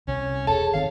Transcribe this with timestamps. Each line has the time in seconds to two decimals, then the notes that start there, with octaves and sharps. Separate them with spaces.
0.07 C2 C3 C#4
0.47 E1 G#4 A4 C#5 A5
0.74 G1 D#3 C4 C#5 F5